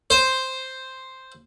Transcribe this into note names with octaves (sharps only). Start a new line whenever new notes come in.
C5